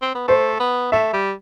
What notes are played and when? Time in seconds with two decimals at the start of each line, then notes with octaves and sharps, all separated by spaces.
0.02 C4
0.15 B3
0.28 A3 C5
0.60 B3
0.92 A3 E5
1.13 G3